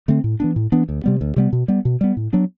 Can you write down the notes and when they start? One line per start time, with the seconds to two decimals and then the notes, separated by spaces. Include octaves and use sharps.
0.08 D3 A3 C4
0.24 A2
0.40 E3 B3 D4
0.56 A2
0.72 E3 B3 D4
0.89 D2
1.04 C3 G3 B3
1.21 D2
1.36 C3 G3 B3
1.53 B2
1.68 G3 B3
1.85 B2
2.01 G3 B3
2.17 A2
2.33 F#3 B3 D4